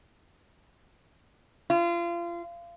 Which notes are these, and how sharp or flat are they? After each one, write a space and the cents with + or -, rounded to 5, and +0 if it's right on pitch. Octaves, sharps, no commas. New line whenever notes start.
F4 -30